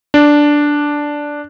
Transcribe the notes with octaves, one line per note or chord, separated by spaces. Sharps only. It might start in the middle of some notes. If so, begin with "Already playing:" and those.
D4